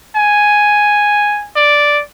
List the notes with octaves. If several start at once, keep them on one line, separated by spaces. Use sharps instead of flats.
G#5
D5